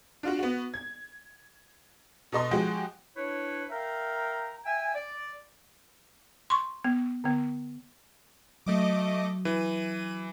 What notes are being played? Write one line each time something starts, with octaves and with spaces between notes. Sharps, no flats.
D4 F4 F#4
B3 F#4
G#6
B2 A4 D#5 C6
F3 G#3 F#4 G4
D4 E4 B4 C#5
A#4 E5 F5 G5 A#5
E5 G5 G#5
D5
C6 C#6
B3
D3 B3
F#3 A3 D#5 D6
E3 D#7